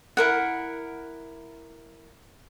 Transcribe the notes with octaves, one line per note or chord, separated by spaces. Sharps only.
E4 A#4 F#5